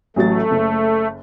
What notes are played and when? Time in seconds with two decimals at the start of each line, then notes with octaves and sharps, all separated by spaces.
0.16 A1 F#3 A3 A6
0.51 F#1